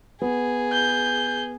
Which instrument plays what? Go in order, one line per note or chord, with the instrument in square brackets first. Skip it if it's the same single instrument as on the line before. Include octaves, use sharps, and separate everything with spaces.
[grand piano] B3 [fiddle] G#4
[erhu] G6